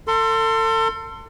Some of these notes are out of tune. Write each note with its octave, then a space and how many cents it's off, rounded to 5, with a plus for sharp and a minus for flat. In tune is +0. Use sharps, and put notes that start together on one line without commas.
A4 +35 C6 +0